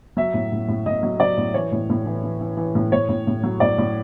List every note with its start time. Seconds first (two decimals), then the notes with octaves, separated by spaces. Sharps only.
0.17 F#3 E5
0.34 A2
0.52 A2
0.68 A2
0.86 A2 D#5
1.03 F#3
1.20 F#3 D5
1.37 A2
1.54 E3 C#5
1.72 A2
1.90 A2
2.06 E3
2.23 E3
2.41 E3
2.57 E3
2.75 A2
2.92 A2 C#5
3.09 A2
3.27 A2
3.43 F#3
3.60 A2 D5
3.78 A2